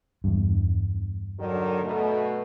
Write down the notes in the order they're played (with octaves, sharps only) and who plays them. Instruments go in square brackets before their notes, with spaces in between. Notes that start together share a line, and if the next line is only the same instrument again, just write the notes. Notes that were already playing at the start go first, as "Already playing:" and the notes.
[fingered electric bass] E2 G2
[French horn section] D3 D#3 F#3
B2 A3